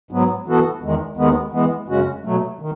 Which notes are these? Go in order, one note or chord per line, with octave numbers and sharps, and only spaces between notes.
G#2 F#3 B3
E3 B3 F#4 A4
E2 D#3 G#3
D#2 D#3 G#3 B3
E3 G#3 B3
F#2 C#3 G#3 C#4 F#4
B2 F#3 A3
D#3